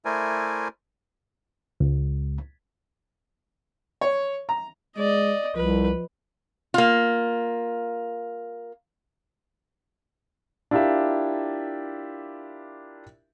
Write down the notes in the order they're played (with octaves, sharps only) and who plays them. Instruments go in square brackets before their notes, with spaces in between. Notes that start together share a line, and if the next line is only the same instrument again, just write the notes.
[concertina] A3 E4 A#4 C5 D5 G#5
[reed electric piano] C#2
[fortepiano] C#5
A#5
[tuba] G#3 [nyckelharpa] D5 D#5
[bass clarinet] C2 [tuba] F3 [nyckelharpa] B4
[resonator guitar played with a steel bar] A#3 F4
[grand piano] D4 E4 F4 G4 A#4 E5